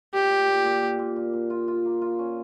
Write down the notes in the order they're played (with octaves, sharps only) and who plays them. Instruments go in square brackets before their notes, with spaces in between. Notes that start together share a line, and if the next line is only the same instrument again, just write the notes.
[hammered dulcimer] A#2 [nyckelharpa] G4
[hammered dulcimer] A#2
A#2
A#2
A#2
A#2
A#2
A#2
F4
F4
A#3
F4
C#4